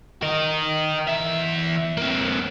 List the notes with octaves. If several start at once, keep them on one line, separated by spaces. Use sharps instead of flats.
A#4 D#5
E2 E5
A#3 C4